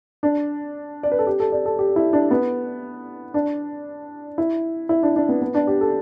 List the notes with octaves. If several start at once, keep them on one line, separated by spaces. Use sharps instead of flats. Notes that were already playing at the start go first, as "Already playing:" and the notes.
D4
D5
B4
A4
G4
A4
D5
A4
G4
E4
D4
B3
D4
E4
E4
D4
D4
B3
B3
D4
G4
A4